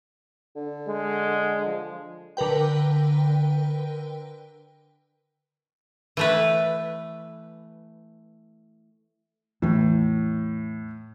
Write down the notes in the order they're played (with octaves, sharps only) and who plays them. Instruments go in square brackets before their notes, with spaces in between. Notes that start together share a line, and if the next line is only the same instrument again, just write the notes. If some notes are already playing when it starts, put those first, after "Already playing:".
[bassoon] D3
[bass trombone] G#3
F3
[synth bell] D3 A#4 B4 G5
[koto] E3 A3 B4
[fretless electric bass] E2 E3 [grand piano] A2